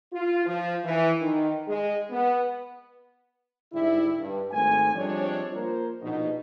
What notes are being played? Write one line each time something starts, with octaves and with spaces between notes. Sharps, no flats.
F4
F3
E3
D#3
G#3
B3
G#2 D3 G3 E4
G2
G#1 A3 C4 G#5
F3 G3 G#3 C4 D4 C#5
A#3 F4 A#4 C5
A#1 B2 D#4